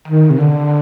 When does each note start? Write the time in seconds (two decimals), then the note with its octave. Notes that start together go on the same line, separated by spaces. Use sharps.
0.08 D#3
0.30 C3
0.40 D3